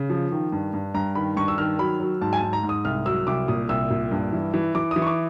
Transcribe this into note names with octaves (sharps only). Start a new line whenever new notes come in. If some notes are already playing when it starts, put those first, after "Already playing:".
Already playing: C#3
F3
D#3
G2
G2
G2 A#5
D#3 B5
G2 C#6
E6
D#3 F6
F#3 B5
F#3
G#2 A5
G#5
A5
G#2
A#5
G#2
D#6
C2 F6
F#3 E6
C2 D6
A#2 D#6
C2 E6
A#2
G2
E3
E3
E3 D6
E3 D#6
C#6
D6